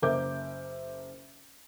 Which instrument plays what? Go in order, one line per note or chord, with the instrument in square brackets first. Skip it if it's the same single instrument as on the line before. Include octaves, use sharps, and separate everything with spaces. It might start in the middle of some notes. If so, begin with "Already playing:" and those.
[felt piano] F#1 A#4 E5 D6 G6